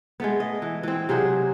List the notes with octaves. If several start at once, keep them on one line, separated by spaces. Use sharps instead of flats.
G#3 A3 B3
D#5
E3
E3 C4
C3 F#3 G#4 C5